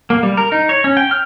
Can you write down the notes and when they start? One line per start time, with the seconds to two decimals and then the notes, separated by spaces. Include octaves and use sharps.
0.10 A#3
0.23 G3
0.37 A#4
0.52 D#4
0.69 C#5
0.84 C#4
0.97 G5
1.11 F6